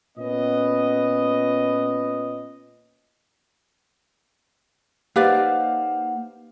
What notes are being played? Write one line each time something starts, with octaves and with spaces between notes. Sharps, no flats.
A#2 B3 C#4 D#5
A#3 D#4 G4 B4 C5 D5 F5 F#5